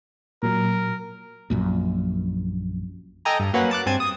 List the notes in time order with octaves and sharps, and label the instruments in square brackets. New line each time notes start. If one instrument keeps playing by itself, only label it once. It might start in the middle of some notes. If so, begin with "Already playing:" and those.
[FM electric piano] A#2 F#3 [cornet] A#4
[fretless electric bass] A#1 F#2 A#2
[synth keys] A4 D#5 G5 G#5 A#5
G2
F#3 A#3 C#4 B4 F#5
A5 D6 F#6
G2 C4 G#5 A5 G#6
D#6